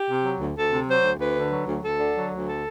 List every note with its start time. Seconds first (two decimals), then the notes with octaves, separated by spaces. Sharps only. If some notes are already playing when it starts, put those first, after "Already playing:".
Already playing: G4
0.09 C3
0.24 F#3
0.40 D2
0.56 D2 A4
0.71 C3
0.87 F#3 C5
1.03 D2
1.19 D2 B4
1.35 D3
1.51 F#3
1.67 D2
1.82 D2 A4
1.99 D3
2.15 F#3
2.31 D2
2.46 A4